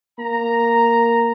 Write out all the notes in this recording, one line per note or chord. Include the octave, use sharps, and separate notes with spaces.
A#3 A#5